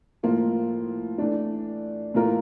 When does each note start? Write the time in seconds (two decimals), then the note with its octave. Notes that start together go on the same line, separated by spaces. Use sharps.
0.23 A2 F3 A#3 F4
1.18 E3 A3 D4
2.14 A2 E3 A#3 F4 A#4